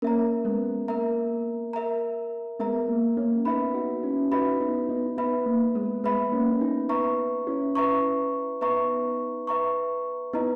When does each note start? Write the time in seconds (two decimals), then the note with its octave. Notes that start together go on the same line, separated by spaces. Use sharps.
0.02 A#3 C#4 A#4 E5 A#5
0.45 G#3 B3
0.88 A#3 A#4 E5 A#5
1.73 A#4 E5 A#5
2.59 G#3 B3 A#4 E5 A#5
2.88 A#3
3.17 A#3 C#4
3.45 B3 D#4 B4 E5 B5
3.74 D#4 F#4
4.03 C#4 E4
4.31 D#4 F#4 B4 E5 B5
4.60 B3 D#4
4.89 B3 D#4
5.17 B3 D#4 B4 E5 B5
5.46 A#3
5.75 G#3 B3
6.04 G#3 B3 B4 E5 B5
6.32 A#3 C#4
6.51 C#4
6.61 B3 D#4
6.89 B4 E5 A#5 C#6
7.47 C#4 E4
7.75 B4 E5 A#5 C#6
8.61 B3 D#4 B4 E5 A#5 C#6
9.47 B4 E5 A#5 C#6
10.33 B3 D#4 E4 B4 D#5 A#5